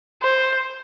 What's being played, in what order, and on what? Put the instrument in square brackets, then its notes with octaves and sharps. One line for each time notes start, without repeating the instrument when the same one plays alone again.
[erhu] C5